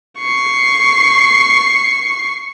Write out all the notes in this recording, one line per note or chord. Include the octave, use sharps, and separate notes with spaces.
C#6 C7